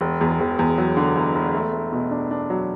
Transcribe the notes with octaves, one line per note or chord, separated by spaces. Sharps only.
E1
E2
E1
E2
F#3
D3
E1
E1
A3
A3
B2
D4
D4
F#3